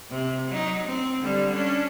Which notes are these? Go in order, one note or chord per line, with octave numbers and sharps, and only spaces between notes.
C3
F#3 D#4
C4
D3 G3
C#4 D4